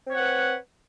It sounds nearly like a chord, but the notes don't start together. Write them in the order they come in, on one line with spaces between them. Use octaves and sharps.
C4 C#5 F#5 B4